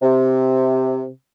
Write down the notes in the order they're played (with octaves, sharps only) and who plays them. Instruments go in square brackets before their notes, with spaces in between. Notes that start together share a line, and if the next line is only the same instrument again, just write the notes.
[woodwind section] C3